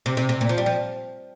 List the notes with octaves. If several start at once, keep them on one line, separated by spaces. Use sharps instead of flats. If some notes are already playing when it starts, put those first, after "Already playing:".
C3
C3
C3
A#2
F3
G3
F3